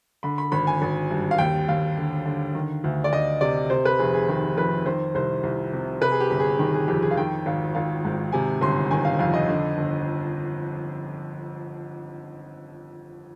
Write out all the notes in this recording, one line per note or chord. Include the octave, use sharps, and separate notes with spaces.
D3 B5
B5
G#1 B5
G#5
G#1
G2
F5
D#2 G5
D#2 F5
D3
D3
D#3
D2
D5
D2 D#5
C3 D5
C3 C5
B4
F1 G#4
G#4
D#3 G#4
F2 B4
D#3 C5
C2 C5
C2
C3
C3 B4
G#4
G4
G1
G#4
D#3 G4
G#4
F2 G4
G#4
F5
D#3 G5
G#1 F5
G#1 F5
G#2
C3 G#5
G1 C6
D#3 G#5
F5
F2 F5
D#5
D3
G1